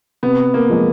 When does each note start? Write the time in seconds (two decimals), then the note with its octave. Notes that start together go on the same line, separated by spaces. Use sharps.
0.23 C3 B3
0.54 A#3
0.70 F3 G#3